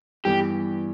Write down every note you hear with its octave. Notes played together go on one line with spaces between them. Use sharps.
G2 E3 G3 B3 G4